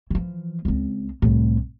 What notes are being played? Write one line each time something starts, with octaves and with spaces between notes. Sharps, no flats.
E3 F3
C#2 C4
C2 A2